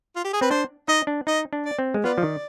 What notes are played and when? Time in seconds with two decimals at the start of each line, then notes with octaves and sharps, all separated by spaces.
0.16 F4
0.24 G4
0.33 G#4
0.41 C4 B4
0.50 D4 C5
0.88 D#4 D#5
1.07 D4
1.27 D#4 D#5
1.53 D4
1.65 D5
1.79 C4
1.94 G#3
2.04 B3 F4 B4 D5
2.18 F3
2.23 D#3